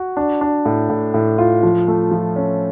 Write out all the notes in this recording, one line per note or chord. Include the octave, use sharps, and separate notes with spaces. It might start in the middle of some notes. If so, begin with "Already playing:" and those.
Already playing: F#4
D4
D4
A2
A2
A2
F4
F3
A3
F3
C#4